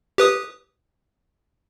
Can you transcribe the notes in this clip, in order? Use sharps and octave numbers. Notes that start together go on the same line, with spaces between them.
G4 B4 D#6